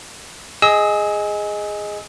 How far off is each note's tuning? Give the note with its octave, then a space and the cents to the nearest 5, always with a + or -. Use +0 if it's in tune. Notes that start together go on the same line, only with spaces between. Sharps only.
G#4 +0 D#5 +0 E6 -35